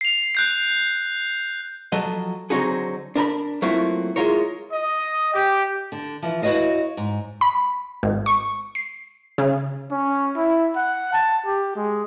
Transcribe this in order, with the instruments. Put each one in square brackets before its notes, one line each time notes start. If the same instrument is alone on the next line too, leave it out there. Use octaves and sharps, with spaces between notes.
[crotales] C7 F7
F#6 G6 C7
[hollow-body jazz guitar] F3 F#3 A4 D#5
D3 F#3 C4 D#4 F#4 G#4
D4 A#4 A#5 B5
F#3 A3 A#3 C4 E4 F4
G#3 E4 F4 A#4 C#5
[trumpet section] D#5
G4
[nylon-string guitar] D3
E3 F3
E4 F#4 B4 C#5 D#5 F5
G#2
[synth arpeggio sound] B5
G#1
C#6
C7
C#3
[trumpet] C#4
E4
F#5
A5
G4
G#3